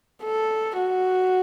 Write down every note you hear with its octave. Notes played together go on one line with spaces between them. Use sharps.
A4
F#4